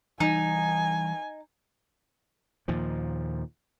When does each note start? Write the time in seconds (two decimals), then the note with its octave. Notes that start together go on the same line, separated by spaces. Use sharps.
0.20 E3 G3 D#4 G#5
2.68 D#2 A#2 F3